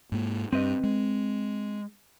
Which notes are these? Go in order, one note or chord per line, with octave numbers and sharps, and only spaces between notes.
G#2 A#3
G2 C4 B4 D#5
G#3